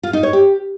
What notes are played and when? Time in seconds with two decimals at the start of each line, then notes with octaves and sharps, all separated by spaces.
0.03 F4
0.13 D#4
0.23 C#5
0.33 G4